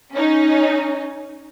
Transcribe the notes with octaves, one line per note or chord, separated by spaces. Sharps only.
C#4 D#4